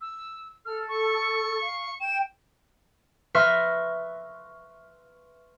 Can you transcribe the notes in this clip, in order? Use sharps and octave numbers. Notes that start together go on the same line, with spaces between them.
E6
A4 F6
C#6
F5
G5 E7
B4 E5 C6 C#6 F6 A#6